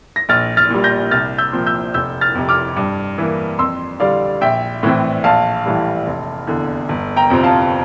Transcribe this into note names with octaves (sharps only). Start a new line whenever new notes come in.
A#6
A#1 F6 A6
F6 A6
A#2 G3
G6 A#6
C2 F6 A6
E6 G6
A#2 F3 C4
E6 G6
F1 E6 G6
F6 A6
F2 C3
D6 F6
G2
E3 A#3
F2 C6 E6
D3 G3 D5 F5
A#1 E5 G5
A2 E3 A3 C4
A#1 F5 A5
A2 E3 G3
F1
E2 D3
G1
G5 A#5
F2 C3 F3 C4
F5 A5